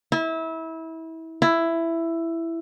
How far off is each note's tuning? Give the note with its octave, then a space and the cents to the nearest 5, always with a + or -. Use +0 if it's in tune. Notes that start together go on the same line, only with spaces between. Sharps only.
E4 -25
E4 +10